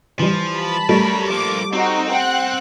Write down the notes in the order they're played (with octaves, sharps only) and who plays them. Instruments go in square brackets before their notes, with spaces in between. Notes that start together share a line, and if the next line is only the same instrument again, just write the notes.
[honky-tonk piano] E3 G3 [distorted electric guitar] F3
[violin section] A5 B5
[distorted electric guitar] F#3 A#4 [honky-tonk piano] G3 A3
[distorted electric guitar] F3 A#3 [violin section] D6
[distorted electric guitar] C4 [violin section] D#4 F#4
[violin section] F#5 G5 F#6